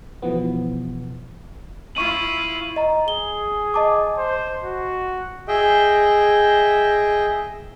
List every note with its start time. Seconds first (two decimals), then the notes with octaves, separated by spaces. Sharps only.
0.22 B2 E3 F3 B3
1.95 E4 F4 C#6 D#7 F#7
2.76 D#5 A#5
3.08 G#4 G7
3.74 D#5 A5 D6
4.18 C5
4.63 F#4
5.48 G#4 D#5 E5 G5